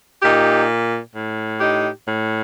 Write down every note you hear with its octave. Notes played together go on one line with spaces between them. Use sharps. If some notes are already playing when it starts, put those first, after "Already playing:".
A#2 D#4 G4
A2
D#4 G4
A2